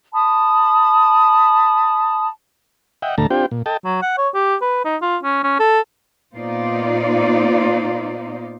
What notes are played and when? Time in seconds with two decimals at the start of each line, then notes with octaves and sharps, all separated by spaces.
0.13 A5 B5 D#6
3.02 D#5 E5 F#5 G5
3.18 D2 A2 D3 A3 A5 A#5
3.30 C4 D4 F4 G4 C5 G5
3.51 A#2
3.66 A4 D#5 G5 A5
3.85 F#3
4.02 F#5
4.18 C#5
4.34 G4
4.61 B4
4.85 D#4
5.02 F4
5.23 C#4
5.44 C#4
5.60 A4
6.35 A#2 B3 D#4 F4 C5 D5